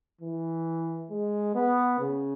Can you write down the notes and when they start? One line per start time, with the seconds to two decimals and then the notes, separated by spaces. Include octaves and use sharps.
0.21 E3
1.11 G#3
1.55 B3
1.99 C#3